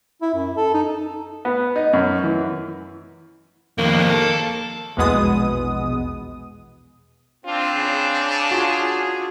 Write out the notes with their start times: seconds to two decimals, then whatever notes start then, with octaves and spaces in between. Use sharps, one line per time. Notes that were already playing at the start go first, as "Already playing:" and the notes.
0.22 E4
0.34 F#2
0.57 A4
0.74 D#4
1.45 B3
1.76 D#4
1.93 F#2
2.24 E3
3.78 F2 D#3 A#3
4.10 A4
4.97 A#1 E2 B2 G#3 B3 D#6
7.45 C4 D4 F4
7.75 C#3
8.51 F4 F#4 G#4